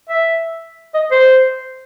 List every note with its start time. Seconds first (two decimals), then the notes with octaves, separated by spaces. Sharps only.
0.09 E5
0.94 D#5
1.11 C5